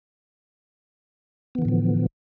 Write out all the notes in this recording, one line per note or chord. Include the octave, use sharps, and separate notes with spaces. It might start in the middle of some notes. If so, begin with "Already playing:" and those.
A2 D3 E3 F3 B3